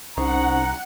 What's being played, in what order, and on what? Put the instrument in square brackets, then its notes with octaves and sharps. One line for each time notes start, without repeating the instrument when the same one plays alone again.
[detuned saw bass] C2 [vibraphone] C#4 D#4 C5 [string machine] F#5 [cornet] A#5